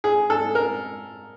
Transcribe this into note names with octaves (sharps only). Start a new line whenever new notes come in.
G#4
A4
A#4